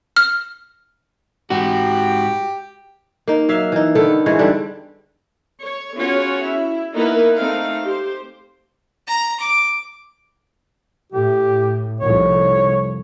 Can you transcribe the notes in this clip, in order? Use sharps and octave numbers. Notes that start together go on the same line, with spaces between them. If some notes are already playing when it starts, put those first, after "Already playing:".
F6
G#2 F#4 G4
A#3 D#4
F#3 E5 F5
E3 D#4
D3 D#3 B3 A4
G#2 E3 G#3 C#5
D3 G3 D4
C#5
B3 C#4 F4 F#4 G#4 C#5
E4
A#3 B3 D#4 E4 A#4 B4
A3 C4 D#4 F5
G4 C5
A#5
D6
A2 G4
F1 C2 F2 C#5